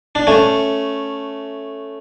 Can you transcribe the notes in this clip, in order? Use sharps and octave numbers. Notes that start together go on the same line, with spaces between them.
D4
A3 C#4